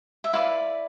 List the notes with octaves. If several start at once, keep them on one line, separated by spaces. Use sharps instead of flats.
E5
E4 B4 D5 F5